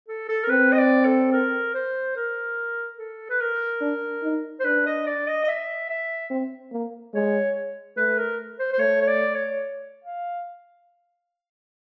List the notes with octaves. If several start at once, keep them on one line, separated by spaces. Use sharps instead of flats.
A4
A4
A#4
C4 B4
D#5
D5
A4
A#4
C5
A#4
A4
B4
A#4
D4
D#4
C5
D4 B4
D#5
D5
D#5
D#5
E5
E5
C4
A#3
G#3 C#5
A3 B4
A#4
C5
C5
A3 C#5
C#5
D5
C#5
F5